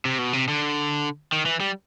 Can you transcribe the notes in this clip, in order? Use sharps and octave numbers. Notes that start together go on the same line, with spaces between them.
C3
B2
C3
D3
D#3
E3
G3